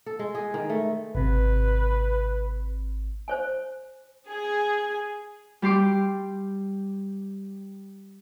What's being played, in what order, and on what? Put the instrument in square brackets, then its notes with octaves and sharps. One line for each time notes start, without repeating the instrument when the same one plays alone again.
[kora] A4
G#3
G#4
D#3
A3
[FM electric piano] G#1 C3 [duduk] B4
[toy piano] C5 C#5 G#5
[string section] G#4
[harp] G3 G4 C6 D6